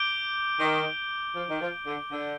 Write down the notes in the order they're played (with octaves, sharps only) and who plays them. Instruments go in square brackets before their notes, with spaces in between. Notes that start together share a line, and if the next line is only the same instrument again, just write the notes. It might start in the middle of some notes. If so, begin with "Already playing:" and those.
Already playing: [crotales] D6 G6 D7 G7
[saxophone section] D#3
F3
D#3
F3
D3
D3